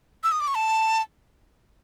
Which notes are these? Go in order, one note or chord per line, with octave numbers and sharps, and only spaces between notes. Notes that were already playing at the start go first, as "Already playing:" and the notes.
E6
D#6
D6
C#6
A5